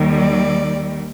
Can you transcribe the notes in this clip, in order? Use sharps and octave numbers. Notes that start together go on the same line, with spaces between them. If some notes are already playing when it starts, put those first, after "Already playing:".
Already playing: D#2 D#3 G3
D5